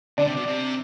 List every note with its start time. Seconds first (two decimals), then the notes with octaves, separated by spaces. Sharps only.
0.18 D3 D4 D5
0.27 C3
0.37 B2
0.47 C3